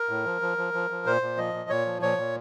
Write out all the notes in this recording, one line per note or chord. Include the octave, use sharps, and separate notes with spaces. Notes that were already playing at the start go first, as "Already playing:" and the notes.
Already playing: A#4
A2
F3
F3
F3
F3
F3
A#2 C5
A#2
F3 D#5
A#2
A#2 C#5
F3
A#2 C#5
A#2